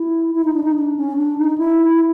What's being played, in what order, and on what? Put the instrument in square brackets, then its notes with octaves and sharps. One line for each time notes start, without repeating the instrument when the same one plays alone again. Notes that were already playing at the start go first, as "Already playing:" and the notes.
Already playing: [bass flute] E4
E4
D#4
D4
D#4
D4
C#4
D4
D#4
E4